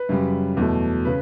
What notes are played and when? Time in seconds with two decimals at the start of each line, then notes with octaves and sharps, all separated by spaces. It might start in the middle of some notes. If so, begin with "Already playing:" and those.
Already playing: B4
0.09 F#2 C#3 G3
0.57 E2 B2 F#3 A3
1.05 C#3 B4